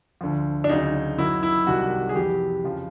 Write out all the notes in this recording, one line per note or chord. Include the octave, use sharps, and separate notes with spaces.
D2 D3 F3
D4
D2 C#3 F#3 D#4
F#2 D#3 F#3 E4
E4
C2 C3 D#3 F#4
G#4
F2 C3 E3 G4
F2 C#3 F3